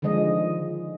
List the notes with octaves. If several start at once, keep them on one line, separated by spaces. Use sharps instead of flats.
D3 D#3 F3 G#3 D#5